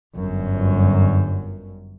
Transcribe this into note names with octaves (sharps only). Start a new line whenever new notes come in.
G1 F#2